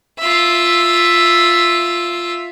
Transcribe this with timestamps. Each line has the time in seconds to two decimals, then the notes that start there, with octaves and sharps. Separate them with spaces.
0.19 F4 E5